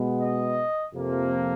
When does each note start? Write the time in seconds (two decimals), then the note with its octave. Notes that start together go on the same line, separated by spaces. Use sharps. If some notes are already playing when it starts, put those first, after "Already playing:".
Already playing: B2 G#3 B3
0.22 D#5
0.92 F2 C3 F3 A#3